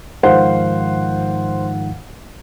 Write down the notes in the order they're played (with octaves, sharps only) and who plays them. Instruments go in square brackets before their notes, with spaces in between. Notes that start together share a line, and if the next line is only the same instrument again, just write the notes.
[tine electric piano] G#2 D#3 F3 [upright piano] C5 [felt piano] F5 F#5